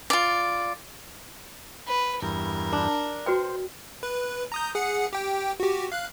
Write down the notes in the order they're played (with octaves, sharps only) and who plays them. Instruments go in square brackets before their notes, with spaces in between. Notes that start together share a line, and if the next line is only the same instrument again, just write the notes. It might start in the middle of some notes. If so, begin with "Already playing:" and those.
[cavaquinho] F4 D5
[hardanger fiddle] B4
[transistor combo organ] E2 G2 [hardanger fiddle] A#4
[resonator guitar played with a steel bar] D4
[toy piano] F#4 B4 G5 [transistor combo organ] C5
[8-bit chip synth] B4
A#5 D#6 G6
G#4 F#5 C#7
G4 G5
F#4 G4
F5 F#6